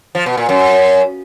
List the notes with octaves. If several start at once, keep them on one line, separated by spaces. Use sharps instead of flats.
F3
B2
A#2
F#2